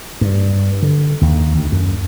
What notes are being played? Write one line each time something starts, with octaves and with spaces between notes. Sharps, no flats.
G2
D3
D#2
D2
F#2